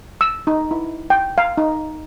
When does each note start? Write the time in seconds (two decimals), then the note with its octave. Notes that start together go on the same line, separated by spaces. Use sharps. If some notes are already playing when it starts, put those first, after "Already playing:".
0.21 E6
0.47 D#4
0.71 E4
1.10 G5
1.38 F5
1.57 D#4